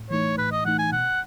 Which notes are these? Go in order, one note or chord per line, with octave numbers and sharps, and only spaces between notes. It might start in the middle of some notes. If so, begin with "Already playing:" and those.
Already playing: A2
E3 A3 D#4 C#5
A2 B4
D#5
E3 A3 D#4 F#5
G#5
B2 F#5